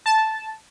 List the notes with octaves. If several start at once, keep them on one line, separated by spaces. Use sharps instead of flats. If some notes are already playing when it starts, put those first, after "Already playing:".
A5